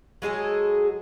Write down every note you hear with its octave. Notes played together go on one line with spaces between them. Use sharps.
F#3 G#3 G#4 A4